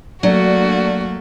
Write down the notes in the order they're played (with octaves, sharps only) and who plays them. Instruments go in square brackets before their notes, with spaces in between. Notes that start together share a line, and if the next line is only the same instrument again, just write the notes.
[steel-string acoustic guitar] F#3 [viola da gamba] A3 A#3 [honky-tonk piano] D4 [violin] F#4